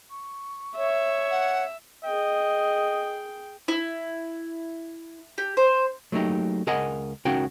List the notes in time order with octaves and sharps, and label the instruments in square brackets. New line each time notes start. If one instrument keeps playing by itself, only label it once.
[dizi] C#6
[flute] C#5 [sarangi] E5
[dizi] F#5
[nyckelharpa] G#4 G5 [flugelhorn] D#5
[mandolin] E4
G4
C5
[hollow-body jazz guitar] F#3 A3 A#3 D#4 G4
C#2 G#4 A#4 D#5 F#5 G#5
C#2 C#4 D#4 F#4 A#4 G5